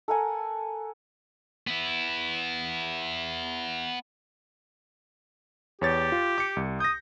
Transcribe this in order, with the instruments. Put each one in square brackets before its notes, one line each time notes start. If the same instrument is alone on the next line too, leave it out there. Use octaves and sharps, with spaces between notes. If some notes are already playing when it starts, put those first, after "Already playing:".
[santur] A4 A#4 F#5 G#5
[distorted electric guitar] B3 E4
[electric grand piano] E2 C#5 A6 [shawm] G4
[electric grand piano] F4
D6 C#7
C2
[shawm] D#6 [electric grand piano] G6 A#6